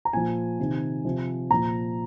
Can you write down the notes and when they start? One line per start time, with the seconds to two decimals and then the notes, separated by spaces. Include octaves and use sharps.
0.05 A#5
0.13 A#2 F3 G#5
0.59 C3 D#3
1.05 C3 F3
1.50 A#2 F3 A#5